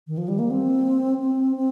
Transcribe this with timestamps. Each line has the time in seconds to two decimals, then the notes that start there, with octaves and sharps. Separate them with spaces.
0.07 D#3
0.17 F3
0.28 G3
0.39 A#3
0.50 C4
1.20 C4
1.56 C4